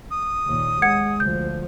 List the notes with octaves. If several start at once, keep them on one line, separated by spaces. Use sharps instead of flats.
D#6
D#2 A#2
G#3 F#5 G#6 C#7
D2 F3 G6